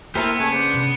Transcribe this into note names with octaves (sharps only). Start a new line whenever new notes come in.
A#3 B3 E4 G4 A4 A#4 C5 A#5
C#3 A3 B4 G#5
D4 C5
C3